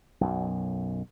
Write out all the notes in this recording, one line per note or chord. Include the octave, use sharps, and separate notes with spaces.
B1 F#2